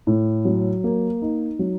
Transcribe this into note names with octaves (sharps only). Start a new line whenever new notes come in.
A2
F#3
A#3
D#4
F#3